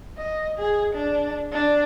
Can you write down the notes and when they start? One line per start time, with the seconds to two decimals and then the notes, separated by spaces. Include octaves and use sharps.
0.18 D#5
0.58 G#4
0.94 D4
1.53 D4